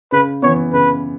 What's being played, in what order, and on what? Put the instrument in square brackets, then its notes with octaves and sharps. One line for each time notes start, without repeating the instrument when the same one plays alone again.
[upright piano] C#3 [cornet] B4
[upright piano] E3 B3 [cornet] C#5
[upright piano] C#3 [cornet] B4